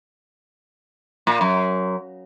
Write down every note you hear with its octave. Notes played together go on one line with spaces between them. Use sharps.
A#2
F#2